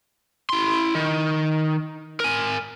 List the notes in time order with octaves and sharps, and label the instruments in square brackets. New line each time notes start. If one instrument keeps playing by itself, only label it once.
[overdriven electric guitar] E4 C6
D#3
A#4 G#5